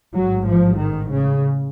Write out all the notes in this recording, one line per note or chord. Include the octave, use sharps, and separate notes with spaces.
A1 G#2 F#3
F3
D#3
C#3